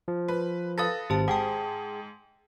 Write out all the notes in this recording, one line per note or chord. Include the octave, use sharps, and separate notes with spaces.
F3
B4
A4 B4 F5 D#6 A6 A#6
G#1 G4 C5 A5
G#2 G#4 F#5 G5 A5